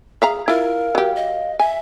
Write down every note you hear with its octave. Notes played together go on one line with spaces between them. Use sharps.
G#4 E5 F5 A#5
E4 F4 A#4 F5
F#3 G4
D#5
E5 G#5